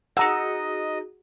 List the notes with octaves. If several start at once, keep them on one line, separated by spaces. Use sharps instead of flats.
D#4 F#4 G#4 D#5 F#5 A#5 E6